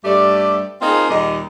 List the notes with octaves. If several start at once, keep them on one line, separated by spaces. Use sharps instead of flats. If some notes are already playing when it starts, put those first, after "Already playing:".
G2 G3 A3 G4 A4 D5
A#3 C4 D#4 F4 G#4
D#2 A#2 G3 G4 D#5